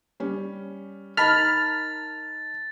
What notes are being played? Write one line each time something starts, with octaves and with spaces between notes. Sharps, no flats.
G3 C#4
D#4 A#4 A5 B5 F6 A6 B6